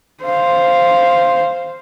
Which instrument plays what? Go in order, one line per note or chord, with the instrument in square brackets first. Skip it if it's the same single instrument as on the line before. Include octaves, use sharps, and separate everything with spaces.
[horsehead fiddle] C5 F5